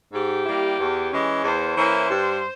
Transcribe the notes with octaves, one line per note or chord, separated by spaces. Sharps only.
G#2 G4
G3 A#3 E4
E2
E3 G#3 C#4
E2 C5
E3 A#3 C#4 E4
G2